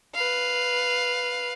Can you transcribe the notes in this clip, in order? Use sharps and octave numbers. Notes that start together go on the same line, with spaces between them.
B4 F5